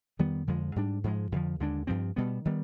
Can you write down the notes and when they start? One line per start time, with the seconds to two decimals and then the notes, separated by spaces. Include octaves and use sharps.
0.19 F2 D#3 G3 B3
0.47 F2 D3 F3 G#3
0.76 G#2 G3 D4
1.04 G#2 F3 G#3
1.32 F2 D3 F3
1.60 D#2 D3 G#3 D4
1.87 G2 F3 C4
2.16 B2 G3 B3
2.45 D#3 G3 B3